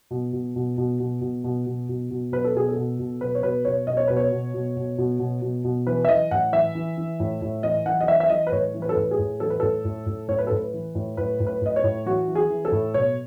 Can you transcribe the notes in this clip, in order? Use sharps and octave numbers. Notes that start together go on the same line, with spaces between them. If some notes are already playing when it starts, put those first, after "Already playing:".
B2
B2
B2
B2
B2
B2
B2
B2
B2
B2
B2 B4
A4
B2 G#4
A4
B2
B2
B2 B4
C#5
B2 B4
B2 C#5
B2 D#5
C#5
B2 B4
C#5
B2
B2
B2
B2
B2
B2
B2
E3 B4
E5
E3 D#5
A2 F#5
E3 E5
E3
E3
A2
A2
E3 D#5
E3 F#5
D#5
E3 E5
E5
E3 D#5
B4
A2 C#5
E3
B4
A4
A2 B4
G#4
A2
E3 A4
B4
A2 A4
A2
A2
A2 C#5
B4
A4
A2 B4
E3
A2
A2 B4
A2
B4
A2 D#5
C#5
A2
E3 F#4
E3
G#4
E3
A4
A2
B2 C#5